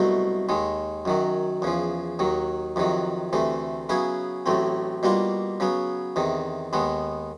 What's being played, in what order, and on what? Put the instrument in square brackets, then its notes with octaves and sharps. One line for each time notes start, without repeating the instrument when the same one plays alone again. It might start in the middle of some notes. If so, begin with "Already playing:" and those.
Already playing: [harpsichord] C2 B2 F#3 A3
D#2 D#3 G#3
F#2 D#3 F#3
E2 C#3 F3
D#2 D#3 F#3
F2 C3 D#3 F#3
D2 C3 E3 A3
C#3 F#3 B3 E4 G#4
A1 A2 F#3 A3 C4
B2 G3 A#3 D4 F4
C#3 F#3 B3
E2 C3 D#3
D#2 D#3 G#3 B3